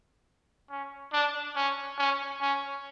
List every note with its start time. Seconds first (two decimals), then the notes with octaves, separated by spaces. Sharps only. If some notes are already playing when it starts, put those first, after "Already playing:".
0.70 C#4
1.13 D4
1.56 C#4
1.99 C#4
2.41 C#4